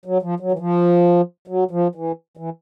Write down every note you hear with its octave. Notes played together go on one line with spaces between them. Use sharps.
F#3
F3
F#3
E3
F3
F#3
F3
E3
E3